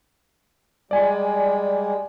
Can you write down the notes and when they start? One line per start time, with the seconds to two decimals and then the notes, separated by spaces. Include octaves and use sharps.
0.91 G3 G#3 D5 G#5